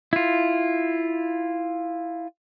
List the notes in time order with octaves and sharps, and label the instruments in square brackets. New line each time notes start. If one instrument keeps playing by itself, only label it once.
[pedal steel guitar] E4 F4